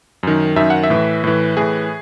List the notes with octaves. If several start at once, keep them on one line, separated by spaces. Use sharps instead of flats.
F#2 D#3
F#2 D#3 E5
F#5
E5
A2 E3
A2 E3
A2 E3 G#4